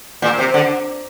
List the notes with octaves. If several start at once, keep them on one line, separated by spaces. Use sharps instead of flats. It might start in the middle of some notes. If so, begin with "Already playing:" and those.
A#2
C3
D3